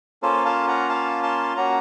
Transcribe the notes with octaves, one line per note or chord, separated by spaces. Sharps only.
A#3 C#4 F4 A4 C5
F5 A5
F#5 A#5
F5 A5
A5 C6
A#3 C#4 F#4 F#5 A#5